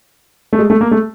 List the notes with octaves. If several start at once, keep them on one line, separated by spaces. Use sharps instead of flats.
A3
G#3
A3
A#3
A3